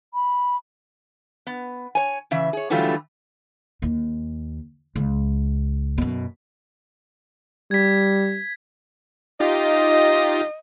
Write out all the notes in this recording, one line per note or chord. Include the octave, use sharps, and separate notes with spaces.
B5
B3
C#5 G#5
C#3 E3 E5
G#4 C#5
D3 E3 F#3 G3 A3 F4
D#2
C#2
F#2 B2
G3 G#6 B6
D#4 F4 G4 D#5